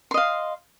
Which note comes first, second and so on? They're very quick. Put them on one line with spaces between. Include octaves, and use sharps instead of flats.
C6 D#5 F5